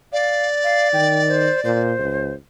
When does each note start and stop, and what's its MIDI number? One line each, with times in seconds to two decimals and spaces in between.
0.12 1.80 74
0.12 0.47 77
0.64 0.88 77
0.93 1.49 51
0.93 1.22 79
1.29 1.60 72
1.64 1.94 46
1.64 2.33 72
1.99 2.33 37